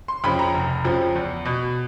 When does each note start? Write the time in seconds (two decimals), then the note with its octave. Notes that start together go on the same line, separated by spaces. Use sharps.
0.08 C6
0.24 F2 C#3 F3 B5
0.39 A#5
0.54 F1
0.85 F2 C#3 F3
1.15 E2
1.45 B2